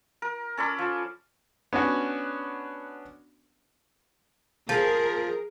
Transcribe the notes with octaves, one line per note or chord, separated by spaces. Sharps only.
A#4
C#4 A4 D5 B5
F3
B3 C#4 D4 F#4
F3 G#4 A#4